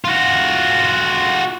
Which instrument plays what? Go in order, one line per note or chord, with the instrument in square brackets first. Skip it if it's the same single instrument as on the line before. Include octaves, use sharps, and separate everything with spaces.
[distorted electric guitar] F4 F#4